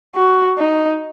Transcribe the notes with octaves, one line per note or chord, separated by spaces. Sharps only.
F#4
D#4